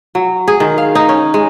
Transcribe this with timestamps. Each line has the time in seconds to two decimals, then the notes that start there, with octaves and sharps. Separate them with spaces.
0.15 F#3
0.48 G#4
0.60 D#3
0.78 F5
0.95 D#4
1.09 C#4
1.34 G#3